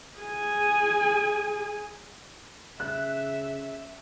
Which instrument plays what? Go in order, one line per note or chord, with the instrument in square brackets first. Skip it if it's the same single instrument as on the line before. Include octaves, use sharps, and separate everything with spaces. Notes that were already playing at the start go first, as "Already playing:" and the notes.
[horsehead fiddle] G#4 G#5
[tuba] C#3 [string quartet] E5 [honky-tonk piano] F#6